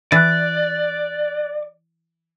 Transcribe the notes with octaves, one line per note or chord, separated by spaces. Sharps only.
E3 D5 F#6 A6